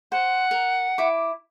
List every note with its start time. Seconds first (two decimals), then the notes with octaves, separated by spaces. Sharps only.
0.12 C5 F#5
0.51 A#4
0.98 E4 D6